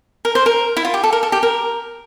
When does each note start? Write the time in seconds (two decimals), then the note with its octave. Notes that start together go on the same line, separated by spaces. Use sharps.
0.25 A#4
0.35 C5
0.46 A#4
0.77 E4
0.85 F4
0.94 G4
1.03 A4
1.13 A#4
1.23 A4
1.32 G4
1.43 A#4